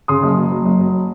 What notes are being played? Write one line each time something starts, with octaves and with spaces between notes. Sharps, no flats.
C#3 C6 D#6
F#1
F#3
F#3
F#1
F#3